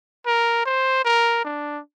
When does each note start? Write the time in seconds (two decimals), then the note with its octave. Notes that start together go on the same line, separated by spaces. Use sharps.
0.26 A#4
0.65 C5
1.05 A#4
1.44 D4